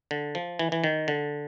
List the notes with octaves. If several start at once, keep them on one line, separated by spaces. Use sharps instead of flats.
D3
F3
E3
E3
D#3
D3